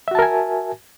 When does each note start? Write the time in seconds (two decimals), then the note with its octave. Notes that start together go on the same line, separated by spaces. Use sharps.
0.08 E5
0.11 F#4
0.15 A5
0.19 A#4
0.22 G#5